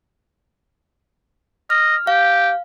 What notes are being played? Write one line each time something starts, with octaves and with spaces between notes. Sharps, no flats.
D#5 F6
G4 F5